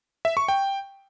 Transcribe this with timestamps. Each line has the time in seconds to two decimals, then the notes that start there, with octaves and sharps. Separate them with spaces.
0.25 E5
0.37 C#6
0.48 G5